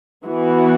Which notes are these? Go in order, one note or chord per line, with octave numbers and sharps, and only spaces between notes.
E3 B3 F#4